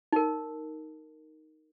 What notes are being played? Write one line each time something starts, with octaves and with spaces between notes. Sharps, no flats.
D#4 A#4